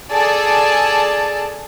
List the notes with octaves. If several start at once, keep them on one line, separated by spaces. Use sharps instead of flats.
G#4 A4 D5 A5